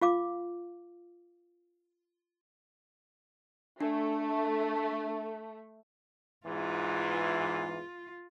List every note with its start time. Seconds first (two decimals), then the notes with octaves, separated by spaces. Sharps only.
0.02 F4 F5 D6
3.80 A3 D4
6.46 E2 G#2 E3 F4